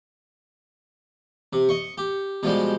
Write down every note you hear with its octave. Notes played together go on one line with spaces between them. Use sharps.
C3
D#5 C#6
G4
B2 F3 G3 G#3